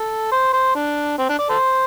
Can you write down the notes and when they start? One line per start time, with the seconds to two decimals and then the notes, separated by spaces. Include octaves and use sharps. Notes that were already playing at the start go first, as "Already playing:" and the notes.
Already playing: A4
0.32 C5
0.53 C5
0.75 D4
1.18 C4
1.29 D4
1.39 D5
1.50 A4 C5